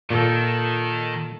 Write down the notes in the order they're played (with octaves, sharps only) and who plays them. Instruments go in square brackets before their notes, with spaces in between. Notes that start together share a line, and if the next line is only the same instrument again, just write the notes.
[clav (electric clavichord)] A#2 [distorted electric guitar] D#3 [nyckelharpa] A4